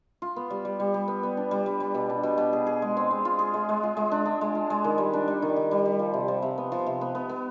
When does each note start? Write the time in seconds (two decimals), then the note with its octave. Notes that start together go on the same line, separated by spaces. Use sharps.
0.22 F4
0.36 B3
0.50 G3
0.65 G3
0.80 G3
0.94 G3
1.08 B3
1.23 B3
1.37 D4
1.51 G3
1.66 G3
1.80 G3
1.94 B2
2.10 D4
2.23 B2
2.38 B2
2.53 G#4
2.67 G#4
2.82 G#3
2.97 C4
3.11 G#3
3.25 F4
3.39 G#4
3.54 G#3
3.69 G#3
3.83 F4
3.97 G#3
4.12 D4
4.26 D4
4.41 G#3
4.55 F4
4.70 G#3
4.84 D#3
4.98 G3
5.13 D4
5.28 G3
5.42 D#3
5.56 D#3
5.71 G3
5.85 G3
5.99 F3
6.14 C3
6.28 F3
6.42 C3
6.58 B3
6.72 F3
6.86 C3
7.01 B3
7.15 B3
7.29 B3